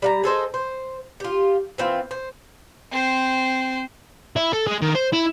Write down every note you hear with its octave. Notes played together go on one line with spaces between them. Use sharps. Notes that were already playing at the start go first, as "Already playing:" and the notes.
G3 F5 A#5
G#4 A4 C5 D#5
C5
F4 G4
E3 C4 F4
C5
C4 C5
E4
A4
G#3
D#3
C5
E4